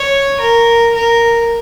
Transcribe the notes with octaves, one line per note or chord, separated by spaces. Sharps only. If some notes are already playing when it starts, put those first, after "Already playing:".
Already playing: C#5
A#4
A#4